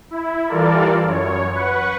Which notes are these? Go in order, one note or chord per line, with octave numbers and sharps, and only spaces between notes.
E4
E3 G3 F4 A4 A#4 D5
F#2 C#5
B4 F#5 C#6